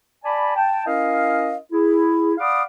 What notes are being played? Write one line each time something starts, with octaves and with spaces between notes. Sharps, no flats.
D5 G#5 A5 B5
G5 A5
C#4 E4 A#4 D#5 F5
E4 G#4
D5 F5 F#5 B5 D6 D#6